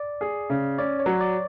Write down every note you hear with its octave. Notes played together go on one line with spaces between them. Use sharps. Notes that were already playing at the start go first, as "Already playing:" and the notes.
Already playing: D5
G#4
C#3
C#4 D5
C#5
F#3
D5